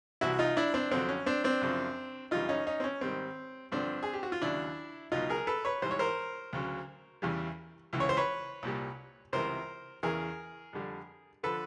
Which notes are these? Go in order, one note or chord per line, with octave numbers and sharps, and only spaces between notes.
C2 C3 E3 E4 F#4
D#4 F4
D4 E4
C4 D4
F2 D3 F#3 C4
C#4
C4 D4
C4 D4
F#2 C#3 F3
F#2 C#3 E3 G3 D#4 F4
C#4 D#4
C#4 D#4
C4
C#4
G#2 D#3 G3 C4
G2 D3 F3 C4 D4
G#4
G4
F#4
F4
D#2 C#3 F#3 D4 E4
C#2 B2 F#3 D#4 F4
G#4 A#4
A4 B4
B4 C#5
G#2 E3 G3 C5
C#5
A#4 C5
D2 C#3 F#3
E2 C#3 E3 G3
C#2 C#3 E3
C#5
C5
B4 C#5
C2 A#2 G3
C#2 C3 E3 G3 A#4 C5
E2 C#3 E3 G#4 A#4
F2 D3 G3
D3 F3 A4 B4